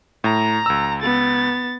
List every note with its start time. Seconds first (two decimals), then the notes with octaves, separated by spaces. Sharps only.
0.24 A2 A#5
0.66 C#2 E6
1.02 B3 A6